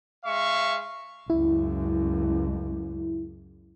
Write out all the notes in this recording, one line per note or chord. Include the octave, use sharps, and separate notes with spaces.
G#3 E5 F5 C#6
C#2 F#2 E4